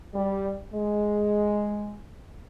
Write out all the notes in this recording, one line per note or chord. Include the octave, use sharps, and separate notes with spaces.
G3
G#3